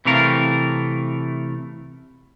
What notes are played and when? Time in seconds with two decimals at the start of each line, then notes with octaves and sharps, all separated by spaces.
0.05 C3 E3 A3 A#4 F5